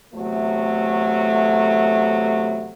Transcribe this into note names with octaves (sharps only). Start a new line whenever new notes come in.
E2 C3 F#3 A3